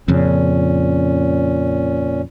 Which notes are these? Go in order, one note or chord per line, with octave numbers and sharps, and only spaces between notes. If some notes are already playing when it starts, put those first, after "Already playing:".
F2 A#2 C#3 C#4